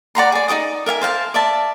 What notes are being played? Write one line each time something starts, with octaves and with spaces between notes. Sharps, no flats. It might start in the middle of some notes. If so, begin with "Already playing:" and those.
D5 F#5 A#5 C6
G#4 D5
D#4 A4 D5 D#6
A#4 E5 F5 G#5
C5 F5 G5 A5
D5 E5 A5